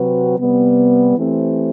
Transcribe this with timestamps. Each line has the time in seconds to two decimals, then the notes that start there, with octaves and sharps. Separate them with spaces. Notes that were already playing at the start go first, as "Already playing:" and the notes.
Already playing: C3 F#3 C4 F#4 B4
0.39 C3 G3 B3
1.16 E3 A3 C4 G4